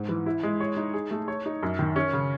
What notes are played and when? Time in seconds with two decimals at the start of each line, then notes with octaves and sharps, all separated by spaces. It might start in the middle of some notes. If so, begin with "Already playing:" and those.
Already playing: G#2
0.09 E3
0.26 E4
0.43 G#3
0.60 C#5
0.77 D#4
0.94 G#4
1.11 A3
1.28 C#5
1.46 D#4
1.63 F#2
1.79 D#3
1.96 C#4
2.13 C#3